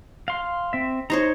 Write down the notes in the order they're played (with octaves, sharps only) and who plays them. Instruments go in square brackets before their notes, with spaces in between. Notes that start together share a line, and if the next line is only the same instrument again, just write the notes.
[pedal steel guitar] F5 C6
C4 E5
[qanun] D#4 C5 C#5 [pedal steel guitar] A#5